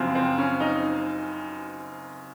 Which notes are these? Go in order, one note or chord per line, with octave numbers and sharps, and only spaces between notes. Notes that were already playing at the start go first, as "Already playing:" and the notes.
Already playing: F#1 F#2 F3 C4
C4
C#4
D#4